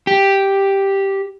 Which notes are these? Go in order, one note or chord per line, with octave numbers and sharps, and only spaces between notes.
G4